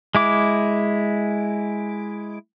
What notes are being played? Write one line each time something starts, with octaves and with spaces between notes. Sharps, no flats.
G#3 E4 D6